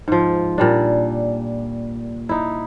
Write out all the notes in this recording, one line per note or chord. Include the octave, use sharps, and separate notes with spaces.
G#2 F3
A#2 G3 D4
D#4 E4